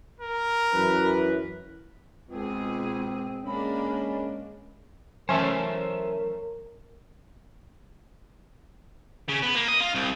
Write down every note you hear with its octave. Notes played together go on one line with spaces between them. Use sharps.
A#4
F#2 E3 B4
C#2 G#2 B2 C4 G#4
G#3 A#3 C#4 D4 B5
E3 F#3 A3 C#4 A#4 C5 E5 A5
C#3
B3
A#3
D#5
F4
C2